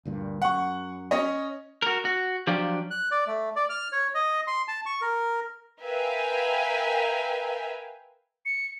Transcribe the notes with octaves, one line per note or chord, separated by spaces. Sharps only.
D2 G2 A#2
F#2 F#5 C#6
C#4 C#5 D#5
F#4 A#4
F#4
F3 F#3 D4 F4 G4
F#6
D5
A3
D5
F6
C#5
D#5
C6
A5
C#6
A#4
A#4 B4 E5 F5 G5 G#5
C#7